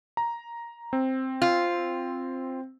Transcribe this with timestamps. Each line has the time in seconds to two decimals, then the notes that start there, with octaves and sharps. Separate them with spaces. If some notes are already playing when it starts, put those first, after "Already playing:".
0.17 A#5
0.93 C4
1.42 F4